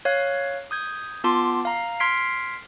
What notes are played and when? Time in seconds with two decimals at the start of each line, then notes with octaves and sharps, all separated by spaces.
0.05 C#5 F5 F#6
0.71 D#6 G6 G#6
1.24 B3 F4 A5 C6 D6
1.65 F5 A#5
2.00 C6 F6 G#6 B6 C7 D7